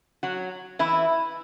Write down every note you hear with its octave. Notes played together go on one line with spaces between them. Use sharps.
F#3 F#4
E3 E4